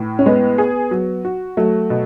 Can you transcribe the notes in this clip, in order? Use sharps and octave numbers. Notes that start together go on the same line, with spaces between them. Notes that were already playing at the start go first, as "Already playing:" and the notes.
Already playing: A2 E3
C#4
G#3 B3
G#4
F#3
F#4
F#3 A3
B2